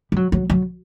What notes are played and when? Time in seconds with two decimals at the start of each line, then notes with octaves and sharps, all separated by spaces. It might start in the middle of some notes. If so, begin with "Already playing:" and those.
0.12 G3
0.16 F#3
0.32 F#3
0.50 F#3